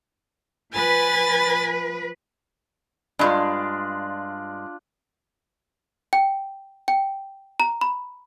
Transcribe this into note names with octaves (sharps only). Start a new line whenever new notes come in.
F3 B4 G#5 B5 A6
G2 G#3 D4 F4
G5
G5
A#5
B5